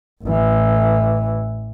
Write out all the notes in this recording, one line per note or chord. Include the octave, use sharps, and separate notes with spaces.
A1 E3